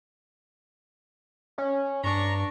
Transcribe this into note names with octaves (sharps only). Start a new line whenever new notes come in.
C#4
G2 D4 A#5 C#6